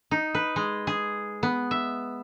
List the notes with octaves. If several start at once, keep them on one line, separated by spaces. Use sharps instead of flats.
D#4
B4
G#3
G#4
B3
E5